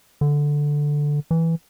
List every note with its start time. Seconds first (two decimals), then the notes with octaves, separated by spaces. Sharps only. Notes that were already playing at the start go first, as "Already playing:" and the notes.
0.21 D3
1.31 E3